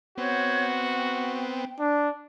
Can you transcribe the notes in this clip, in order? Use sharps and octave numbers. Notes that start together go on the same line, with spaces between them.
B3 C4 F#4 C#5 G6 G#6
G5
D4